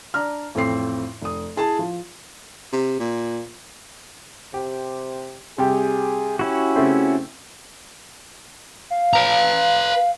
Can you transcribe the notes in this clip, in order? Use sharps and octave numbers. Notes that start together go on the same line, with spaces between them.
D4 A#5 F6
A1 F2 C4 C7
F1 D#6
E4 G#4 A5
F3
C3
A#2
C3 G4
C3 G3 G4 G#4
C#4 E4 F#4 G4
C#3 A3 C4
F5
B4 A#5